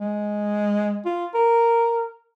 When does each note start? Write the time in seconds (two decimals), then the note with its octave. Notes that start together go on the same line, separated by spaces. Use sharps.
0.01 G#3
1.05 F4
1.34 A#4